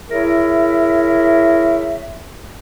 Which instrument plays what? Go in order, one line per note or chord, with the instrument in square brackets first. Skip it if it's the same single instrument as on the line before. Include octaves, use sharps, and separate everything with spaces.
[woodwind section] E4 G#4 A#4 C#5 E5